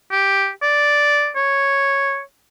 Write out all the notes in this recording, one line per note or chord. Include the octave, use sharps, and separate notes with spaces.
G4
D5
C#5